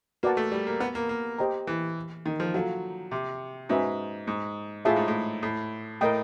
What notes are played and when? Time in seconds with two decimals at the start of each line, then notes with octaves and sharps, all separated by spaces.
0.23 A#3 F#4 B4 D5 F#5 A5
0.37 A3
0.52 G3
0.67 A#3
0.80 B3
0.95 A#3
1.09 A#3
1.39 G4 C5 D#5 G5 A#5
1.67 E3
2.26 D#3
2.40 F3
2.54 F#3 F4 A4 C#5 F5 A#5
3.11 C3
3.69 G#2 C#4 F#4 B4 E5 G#5
4.27 G#2
4.85 A2 F4 G#4 C#5 E5 A5
4.96 G#2
5.08 A2
5.43 A2
6.01 A2 A#4 D#5 G5